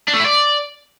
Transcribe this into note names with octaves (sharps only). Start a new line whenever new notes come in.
D4
A3
E4
D5